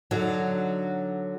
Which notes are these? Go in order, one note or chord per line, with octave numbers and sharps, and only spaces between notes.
D3 F#3 D#4